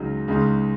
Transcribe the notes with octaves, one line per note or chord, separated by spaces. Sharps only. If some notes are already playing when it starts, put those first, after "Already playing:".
Already playing: C#2 C#3 F#3 D#4
C#2 C#3 G#3 D#4